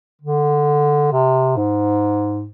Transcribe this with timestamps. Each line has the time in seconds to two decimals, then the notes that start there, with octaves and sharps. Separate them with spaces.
0.21 D3
1.12 C3
1.57 G#2